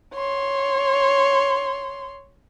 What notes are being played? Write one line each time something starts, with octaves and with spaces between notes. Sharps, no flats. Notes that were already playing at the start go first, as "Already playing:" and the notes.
C#5 C6